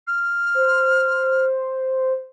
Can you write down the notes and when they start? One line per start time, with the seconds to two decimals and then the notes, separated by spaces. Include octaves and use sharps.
0.07 F6
0.55 C5